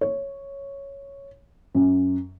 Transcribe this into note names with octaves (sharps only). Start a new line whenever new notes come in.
C#5
F#2